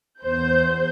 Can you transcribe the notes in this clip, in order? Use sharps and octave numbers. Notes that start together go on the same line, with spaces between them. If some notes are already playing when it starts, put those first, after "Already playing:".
E2 C5 G6